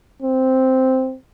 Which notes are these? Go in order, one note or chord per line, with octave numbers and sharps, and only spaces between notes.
C4